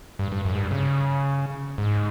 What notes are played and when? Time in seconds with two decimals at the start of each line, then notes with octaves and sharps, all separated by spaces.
0.19 G2
0.32 G2
0.45 F#2
0.53 G#2
0.58 G2
0.71 C#3
1.78 G#2